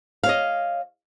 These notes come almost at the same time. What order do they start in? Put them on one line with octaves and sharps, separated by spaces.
F5 C#5 D#5